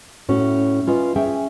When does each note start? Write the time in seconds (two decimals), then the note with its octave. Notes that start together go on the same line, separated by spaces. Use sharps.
0.29 A2 C#4 F#4
0.87 C#4 F4 B4 D#5
1.16 C#4 G#4 E5 G5